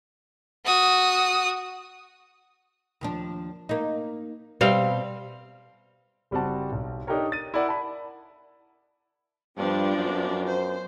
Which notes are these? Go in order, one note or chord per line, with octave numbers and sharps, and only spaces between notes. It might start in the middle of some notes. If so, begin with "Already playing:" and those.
F#4 D#6
D#2 F3 D4
A#3 D#4
B2 G3 C4 F5
F#1 G3 C4 F#4 F#5 A5
B1
D4 D#4 G4 A4 A#4 C#5
A6 D#7
E4 A#4 D5 F#5
A5 B5
G2 F3 B3 D4
F#2
C5